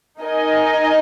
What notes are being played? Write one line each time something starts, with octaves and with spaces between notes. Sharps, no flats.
D#4 A#4 D#5 G#5